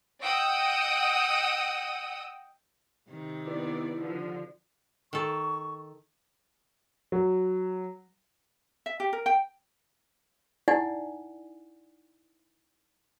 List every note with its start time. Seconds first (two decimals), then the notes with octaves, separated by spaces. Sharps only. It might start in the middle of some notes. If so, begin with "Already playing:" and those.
0.23 D#5 F#5 G5 D#6 E6
3.10 C3 D#3
3.47 B3 E4 B4 D5
4.00 D3 F3
5.13 D#3 A4 C#6
7.12 F#3
8.86 E5
9.00 G4
9.13 A#4
9.26 G5
10.68 D#4 E4 D5 F#5 G#5